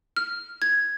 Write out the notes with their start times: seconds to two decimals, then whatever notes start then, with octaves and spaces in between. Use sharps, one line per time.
0.17 F6
0.62 G#6